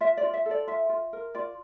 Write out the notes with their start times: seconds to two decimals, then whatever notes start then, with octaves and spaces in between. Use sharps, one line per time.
0.01 F4 E5
0.17 F4 D5
0.33 E5
0.46 A4
0.51 D5
0.67 F4 E5
0.89 F4
1.13 A#4
1.35 F4 D5